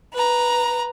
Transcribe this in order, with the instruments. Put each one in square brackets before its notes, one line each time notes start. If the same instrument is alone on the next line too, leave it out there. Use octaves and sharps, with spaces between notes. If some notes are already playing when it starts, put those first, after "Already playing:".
[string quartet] B4 A#5